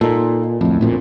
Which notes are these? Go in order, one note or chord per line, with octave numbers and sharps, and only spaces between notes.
A#2 D#4 F4 A4
D1 F2 A2
A#1 F2 A#2